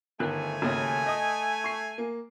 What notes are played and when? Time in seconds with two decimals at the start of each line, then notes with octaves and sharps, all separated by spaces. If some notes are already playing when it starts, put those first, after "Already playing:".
0.20 G1 D#3 A3 G#5 F#6
0.62 G#1 D#2 C#3
1.06 D#5 D#6
1.64 C#6 C7
1.98 A#3